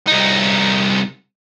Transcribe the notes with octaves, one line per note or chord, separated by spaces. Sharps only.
C2 D#4